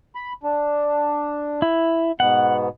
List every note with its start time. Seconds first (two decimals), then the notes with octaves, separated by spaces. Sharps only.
0.15 B5
0.43 D4
1.62 E4
2.20 G#2 B2 B3 F#5